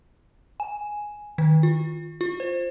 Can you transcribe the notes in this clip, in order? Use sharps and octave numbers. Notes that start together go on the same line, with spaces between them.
G#5
D#3
F4
F4
C5